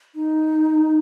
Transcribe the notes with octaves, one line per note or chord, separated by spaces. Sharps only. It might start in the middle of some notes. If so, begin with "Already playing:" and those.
D#4